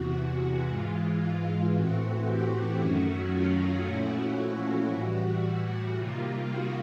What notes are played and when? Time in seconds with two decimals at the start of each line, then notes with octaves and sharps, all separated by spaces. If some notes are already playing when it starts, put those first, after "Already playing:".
Already playing: E2 C3 E3 F#4
0.68 G#2 E3 G#3 F4
1.20 F4
1.74 A2 E3 A3 C4 F#4
2.26 G4
2.79 F#2 D#3 F#3 A3 C#4 F#4
3.32 F4
3.85 A#2 F3 A3 C#4 E4 F#4
4.37 F#4
4.91 A2 E3 G3
5.96 C3 D#3 G3 A#3 F4
6.49 F#4